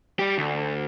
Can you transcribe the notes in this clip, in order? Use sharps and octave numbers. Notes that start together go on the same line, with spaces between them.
G3 G4
D2